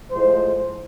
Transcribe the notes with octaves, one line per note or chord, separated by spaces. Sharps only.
A2 F3 G#3 C5